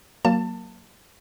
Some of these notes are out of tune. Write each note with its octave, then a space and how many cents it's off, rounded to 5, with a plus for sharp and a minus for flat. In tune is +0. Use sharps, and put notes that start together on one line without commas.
F#3 +0 A#3 +0 A5 +25